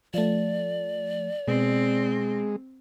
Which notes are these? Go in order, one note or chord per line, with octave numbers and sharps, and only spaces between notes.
F3 A3 D5
B2 G#3 C4